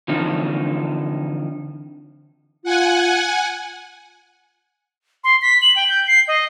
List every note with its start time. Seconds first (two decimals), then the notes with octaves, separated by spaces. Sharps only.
0.08 D3 E3 F3 C4 D#4
2.64 F4 F#5 G#5
5.24 C6
5.42 B6
5.62 F#7
5.76 G5
5.89 G6
6.08 C7
6.28 D#5